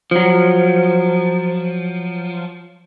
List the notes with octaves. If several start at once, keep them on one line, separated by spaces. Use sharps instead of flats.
F3 F#3